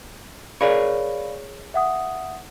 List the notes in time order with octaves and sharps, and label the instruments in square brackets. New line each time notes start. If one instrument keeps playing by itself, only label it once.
[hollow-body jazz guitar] G#4 A#4 C#5 [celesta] D5 F5 B5
[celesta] E5 F#5 D#6